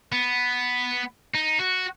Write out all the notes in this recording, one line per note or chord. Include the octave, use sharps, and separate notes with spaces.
B3
D#4
F#4